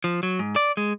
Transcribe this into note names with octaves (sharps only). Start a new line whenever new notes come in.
F3
F#3
G#2
D5
G#3